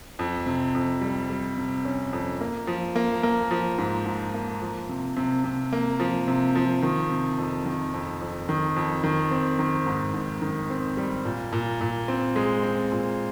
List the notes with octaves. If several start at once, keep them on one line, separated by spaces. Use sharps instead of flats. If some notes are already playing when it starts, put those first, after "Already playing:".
F2
C3
F2
G3
G3
C3
C#4
F2
A#3
F3
A#3
A#3
F3
G#2
G#2
A#3
F3
C3
C3
C3
A#3
F3
C3
F3
D#3
C3
F2
D#3
F2
F2
D#3
F2
D#3
C4
D#3
G#2
G#2
D#3
C4
G3
A#2
A#2
A#2
C4
G#3
C4
A#2